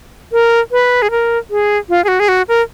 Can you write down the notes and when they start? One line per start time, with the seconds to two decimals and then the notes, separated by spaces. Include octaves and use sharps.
0.32 A#4
0.72 B4
1.02 G#4
1.11 A#4
1.50 G#4
1.89 F4
2.04 G#4
2.08 F#4
2.20 G#4
2.28 F#4
2.48 A#4